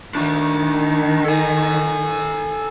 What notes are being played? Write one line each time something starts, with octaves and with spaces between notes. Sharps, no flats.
D#3 D4 F#4
A4 G#5